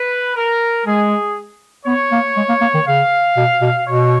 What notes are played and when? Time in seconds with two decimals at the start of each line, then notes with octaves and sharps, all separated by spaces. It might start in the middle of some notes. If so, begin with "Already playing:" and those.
Already playing: B4
0.36 A#4
0.86 G#3 G#4
1.86 B3 C#5
2.12 A#3
2.37 G#3
2.49 A#3
2.61 A#3
2.74 D#3
2.87 C#3 F5
3.37 B2
3.62 B2
3.87 B2 C#5